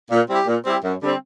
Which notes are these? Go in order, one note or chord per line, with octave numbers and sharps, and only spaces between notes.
A#2
G3 C4 E4 G4
A#2
G3 C4 E4 G4
F#2
D3 G3 C4